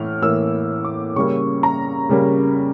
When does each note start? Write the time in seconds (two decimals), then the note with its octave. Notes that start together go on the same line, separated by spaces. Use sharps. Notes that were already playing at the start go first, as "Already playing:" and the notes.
Already playing: A2 E3 F6
0.22 A2 E3 A#3 E6
0.84 D6
1.16 C#3 G3 A#3 C#6
1.63 A#5
2.09 C#3 G3 A#3